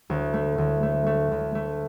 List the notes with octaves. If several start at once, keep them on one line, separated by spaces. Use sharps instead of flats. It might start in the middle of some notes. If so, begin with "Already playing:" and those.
D2
A3
D2
A3
A3
D2
A3